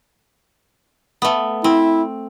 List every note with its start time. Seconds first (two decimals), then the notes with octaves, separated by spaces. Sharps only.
1.22 A3 B3
1.64 C4 E4